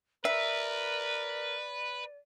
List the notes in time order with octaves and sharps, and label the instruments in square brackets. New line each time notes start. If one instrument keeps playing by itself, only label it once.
[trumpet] A#4 [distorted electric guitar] B4 [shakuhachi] D5 [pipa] E5